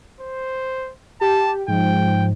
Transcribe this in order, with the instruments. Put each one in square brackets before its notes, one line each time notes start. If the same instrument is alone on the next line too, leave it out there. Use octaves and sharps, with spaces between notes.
[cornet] C5
[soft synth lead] G4 [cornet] A5
[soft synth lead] G#2 [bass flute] F3 [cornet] G5